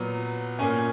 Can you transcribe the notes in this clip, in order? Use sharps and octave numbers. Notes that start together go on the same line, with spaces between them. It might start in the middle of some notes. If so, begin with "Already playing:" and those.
Already playing: A#2 F#3 B3
A#2 A#3 C#4 G#5